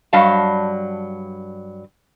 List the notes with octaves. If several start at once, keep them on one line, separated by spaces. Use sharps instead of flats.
G2 F#3 G3 D#5 F5 A5